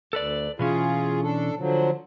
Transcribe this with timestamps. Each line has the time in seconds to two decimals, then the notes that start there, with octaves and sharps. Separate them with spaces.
0.13 D2 A4 B4 D5
0.59 B2 E3 C#4 F4 G#4
1.22 D4 A4
1.57 D3 F3 F#3